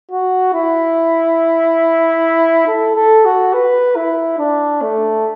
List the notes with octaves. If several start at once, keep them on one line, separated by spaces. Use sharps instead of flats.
F#4
E4
A4
A4
F#4
B4
E4
D4
A3